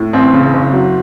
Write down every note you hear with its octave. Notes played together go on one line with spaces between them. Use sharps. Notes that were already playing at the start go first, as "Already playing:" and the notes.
Already playing: A2
A1 C4
C#3
F#1
F#3